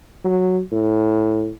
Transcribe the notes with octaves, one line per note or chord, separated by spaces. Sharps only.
F#3
A2